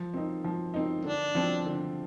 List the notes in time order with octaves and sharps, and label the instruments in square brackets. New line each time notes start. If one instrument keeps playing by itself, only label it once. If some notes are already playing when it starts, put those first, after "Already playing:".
Already playing: [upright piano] F3
C4 D#4
F3
C4 D#4
[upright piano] D3 [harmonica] D4
[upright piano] F3 C4
D3